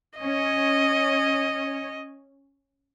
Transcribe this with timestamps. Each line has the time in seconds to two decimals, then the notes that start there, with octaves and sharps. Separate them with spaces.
0.19 C#4 C#5 D#5